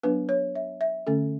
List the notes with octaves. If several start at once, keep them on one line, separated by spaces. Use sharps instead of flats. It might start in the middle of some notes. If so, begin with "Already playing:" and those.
F#3 B3 D4 B4
C#5
E5
E5
D3 A3 C#4 A4